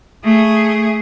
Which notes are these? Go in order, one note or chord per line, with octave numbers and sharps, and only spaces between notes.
A3 G#4